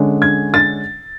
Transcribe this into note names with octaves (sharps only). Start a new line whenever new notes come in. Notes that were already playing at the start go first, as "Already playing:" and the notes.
Already playing: D3 G#3 C#4
G#6
A6